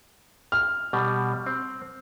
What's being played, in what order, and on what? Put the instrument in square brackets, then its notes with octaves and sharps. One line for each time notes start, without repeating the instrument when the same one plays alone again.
[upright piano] F6
[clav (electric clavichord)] B2 G3
C4